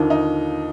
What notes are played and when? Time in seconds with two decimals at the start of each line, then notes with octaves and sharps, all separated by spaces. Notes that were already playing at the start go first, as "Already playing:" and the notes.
Already playing: D#2 D3 F3 A#3 D#4
0.10 D#4